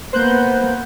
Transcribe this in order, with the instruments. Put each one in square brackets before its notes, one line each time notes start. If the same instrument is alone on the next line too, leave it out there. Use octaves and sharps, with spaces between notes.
[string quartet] A#3 B3 [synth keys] C5 F#6 G6